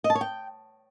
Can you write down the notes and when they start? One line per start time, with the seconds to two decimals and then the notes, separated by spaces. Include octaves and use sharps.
0.04 D#5
0.10 A5
0.15 C#5
0.21 G5